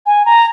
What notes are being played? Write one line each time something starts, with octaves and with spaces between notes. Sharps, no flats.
G#5
A#5